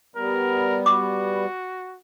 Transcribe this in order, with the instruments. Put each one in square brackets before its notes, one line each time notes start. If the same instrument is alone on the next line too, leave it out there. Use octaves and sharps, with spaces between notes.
[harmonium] G3 B3 [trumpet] A#4
[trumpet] F#4 [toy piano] D6